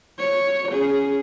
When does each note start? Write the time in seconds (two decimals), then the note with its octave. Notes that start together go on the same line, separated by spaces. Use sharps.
0.19 C#5
0.71 C#4 G#4